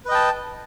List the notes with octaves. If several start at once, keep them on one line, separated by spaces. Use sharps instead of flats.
B4 D#5 G5 A5